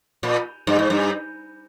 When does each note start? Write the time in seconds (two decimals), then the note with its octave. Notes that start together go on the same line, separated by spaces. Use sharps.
0.23 A#2
0.67 G2
0.79 G#2
0.90 G2